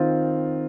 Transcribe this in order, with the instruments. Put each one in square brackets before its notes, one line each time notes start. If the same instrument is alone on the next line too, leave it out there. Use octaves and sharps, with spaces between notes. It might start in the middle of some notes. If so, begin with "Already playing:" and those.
Already playing: [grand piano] D#3 C4 F4